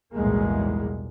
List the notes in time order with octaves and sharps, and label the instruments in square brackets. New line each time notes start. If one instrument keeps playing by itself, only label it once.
[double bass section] B1 E2 A2 G3 G#3 A#3